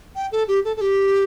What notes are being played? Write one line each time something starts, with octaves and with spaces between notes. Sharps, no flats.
G5
A4
G4
A4
A4
G4